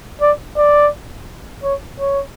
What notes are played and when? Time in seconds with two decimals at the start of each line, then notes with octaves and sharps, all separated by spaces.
0.21 D5
0.57 D5
1.63 C#5
2.00 C#5